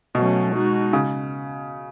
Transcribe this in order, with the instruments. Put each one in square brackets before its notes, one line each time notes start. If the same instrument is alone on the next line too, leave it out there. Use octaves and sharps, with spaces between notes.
[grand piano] B2 [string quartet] F#3 A3 C#4
[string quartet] G#3 D#4 F#4
[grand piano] C#3